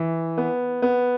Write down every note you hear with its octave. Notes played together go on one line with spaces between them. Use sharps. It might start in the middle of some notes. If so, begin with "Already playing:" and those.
Already playing: E3
B3
B3